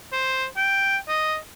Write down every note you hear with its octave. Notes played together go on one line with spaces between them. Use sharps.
C5
G5
D#5